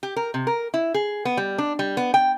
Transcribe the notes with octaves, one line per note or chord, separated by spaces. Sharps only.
G4
A#4
C3
A#4
E4
G#4
B3
G3
D4
G3
B3
G5